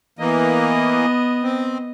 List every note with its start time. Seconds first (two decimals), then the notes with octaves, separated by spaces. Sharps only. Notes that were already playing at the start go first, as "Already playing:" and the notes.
0.19 E3 A#3 B3 D#5
1.43 C4